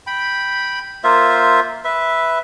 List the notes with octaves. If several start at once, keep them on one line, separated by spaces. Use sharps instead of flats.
G5 B5
A#3 F4 C5 E5
B4 E5